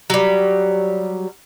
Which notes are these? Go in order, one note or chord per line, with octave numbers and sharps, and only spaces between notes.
F#3 G3